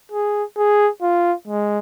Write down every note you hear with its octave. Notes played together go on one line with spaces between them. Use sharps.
G#4
G#4
F4
G#3